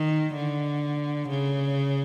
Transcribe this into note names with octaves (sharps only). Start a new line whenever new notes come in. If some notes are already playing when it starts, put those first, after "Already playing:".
Already playing: D#3
D3
C#3